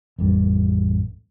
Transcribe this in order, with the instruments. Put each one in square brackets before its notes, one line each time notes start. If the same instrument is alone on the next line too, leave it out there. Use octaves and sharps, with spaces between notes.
[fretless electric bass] A1 F2 G3